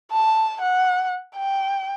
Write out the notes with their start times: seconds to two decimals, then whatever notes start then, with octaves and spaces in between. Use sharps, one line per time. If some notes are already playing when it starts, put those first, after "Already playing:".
0.12 A5
0.61 F#5
1.37 G5